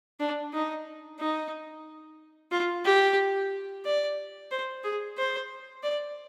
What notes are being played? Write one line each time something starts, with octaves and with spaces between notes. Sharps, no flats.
D4
D#4
D#4
F4
G4
D5
C5
G#4
C5
D5